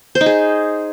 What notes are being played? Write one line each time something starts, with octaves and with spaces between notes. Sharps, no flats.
C5
D#4
G#4